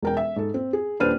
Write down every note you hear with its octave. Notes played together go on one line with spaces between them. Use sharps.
E1 A#4 G5
E5
G#2 A4
C4
G#4
D#1 D4 B4 C5 F6 D#7